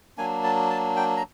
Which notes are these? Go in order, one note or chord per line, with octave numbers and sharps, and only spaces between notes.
F#3 A#3 D4 G#5
A5
A5
G5
A#5